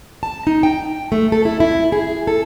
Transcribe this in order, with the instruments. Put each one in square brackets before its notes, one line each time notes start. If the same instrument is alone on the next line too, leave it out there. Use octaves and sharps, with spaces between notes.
[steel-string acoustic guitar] A5
D#4
G5
A3
A4
E4
E4
G#4
A4